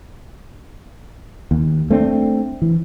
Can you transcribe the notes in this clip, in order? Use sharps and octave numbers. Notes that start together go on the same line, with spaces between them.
D#2
A3 C4 D4
E3